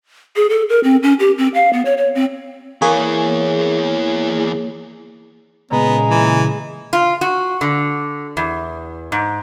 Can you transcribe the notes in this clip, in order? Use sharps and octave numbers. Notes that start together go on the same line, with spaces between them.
G#4
A4
A#4
C4
C#4
G4
C4
F5
B3
C#5
C#5
C4
E2 E3 A#3 G#4 C#5
A#2 C#3 G#3 B3 A#5
E3
F4
F#4
D3
E2
G#2